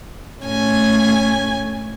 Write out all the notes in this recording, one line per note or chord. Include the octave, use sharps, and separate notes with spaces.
A2 A3 C#4 G#5 G#6